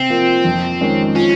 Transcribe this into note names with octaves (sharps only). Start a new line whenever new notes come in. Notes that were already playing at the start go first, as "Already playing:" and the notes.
Already playing: C3 C4
F3 A#3
F2
D#3 G#3 C#4
F3 C#4